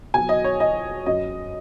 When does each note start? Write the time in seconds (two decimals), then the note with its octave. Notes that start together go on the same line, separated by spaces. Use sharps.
0.14 B2 F#3 G#5
0.29 D#5
0.44 C#5
0.60 D#5
1.06 F#2 F#3 D#5